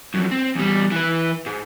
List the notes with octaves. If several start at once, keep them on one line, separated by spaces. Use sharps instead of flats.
F#2 F3
C4
E2 G3
E3 B4
G#2